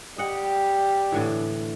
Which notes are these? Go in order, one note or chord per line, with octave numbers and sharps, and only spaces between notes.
G3 G4 D#5 F#5
A2 D3 E3